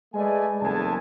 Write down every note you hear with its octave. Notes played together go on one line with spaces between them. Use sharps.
G#3 A3 B4 D5 D#5 G#5
F#1 E2 G3 A4 G#5 A5